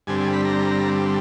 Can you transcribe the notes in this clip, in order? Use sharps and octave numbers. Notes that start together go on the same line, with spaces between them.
G2 D3 G3 C4 G#5
G#5
B5
A#5